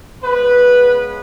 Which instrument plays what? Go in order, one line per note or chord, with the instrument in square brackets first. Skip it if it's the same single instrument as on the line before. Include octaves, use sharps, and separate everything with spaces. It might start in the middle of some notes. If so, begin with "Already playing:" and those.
[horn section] C#3 G#3 B3 B4